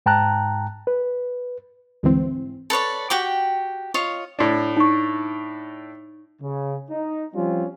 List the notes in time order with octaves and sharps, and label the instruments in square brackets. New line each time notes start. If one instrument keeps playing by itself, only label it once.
[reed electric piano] G#2 G5 A5 A#5 F#6
B4
[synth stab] D2 G#2 E3 C4
[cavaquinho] A4 B4 C#5 D5
F#4 G4 G5 D6
F4 C#5 D#5
[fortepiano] A2 D4
[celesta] D#4 C#6
[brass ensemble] C#3
D#4
F3 G3 C4 C#4 F4